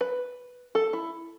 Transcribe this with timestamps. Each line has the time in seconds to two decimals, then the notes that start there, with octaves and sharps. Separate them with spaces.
0.01 B4
0.75 A4
0.93 E4